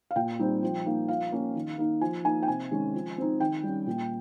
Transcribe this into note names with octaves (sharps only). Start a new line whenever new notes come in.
F5
A#2 G5
G3 C4 D#4
F3
A#3 D#4
F3 F5
A#3 C#4
D#3
A#3 D#4
F3 G#5
A#3 D#4 G#5
G5
C3 G#5
D#3 G#3 C#4
F3
C4 D#4
D#3 G5
G3 C#4
A#2